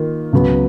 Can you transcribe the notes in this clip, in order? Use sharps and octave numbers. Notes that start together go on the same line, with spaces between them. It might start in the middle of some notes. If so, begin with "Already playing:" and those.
Already playing: D#3 A#3 F4
C#2 C#3 F#3 B3